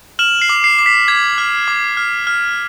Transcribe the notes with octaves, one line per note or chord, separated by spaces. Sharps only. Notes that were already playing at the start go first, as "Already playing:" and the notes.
F6 E7 F#7
C7
D6
C7
D6
B6
D6 G#6
F6
D6
F6
F6